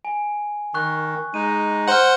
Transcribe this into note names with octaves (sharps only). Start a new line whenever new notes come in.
G#5
D#3 C#6 F#6
G#3 D#4 D#7
C5 F#5 F6 F#7